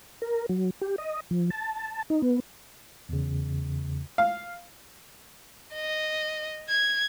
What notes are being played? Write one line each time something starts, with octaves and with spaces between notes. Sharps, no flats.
A#4
F#3
G4
D#5
F3
A5
D#4
B3
E2 C#3
F5
D#5
G#6